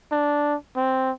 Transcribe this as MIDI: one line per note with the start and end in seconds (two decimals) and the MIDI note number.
0.12 0.55 62
0.76 1.11 60